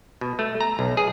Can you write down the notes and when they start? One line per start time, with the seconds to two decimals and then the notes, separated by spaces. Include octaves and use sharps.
0.21 B2
0.39 A3
0.61 A#5
0.79 B1
0.97 G#4